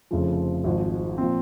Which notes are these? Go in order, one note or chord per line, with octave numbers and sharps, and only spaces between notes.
F1 F2 C#3 F3
G#1 G#2 F3
A#2 F3 C4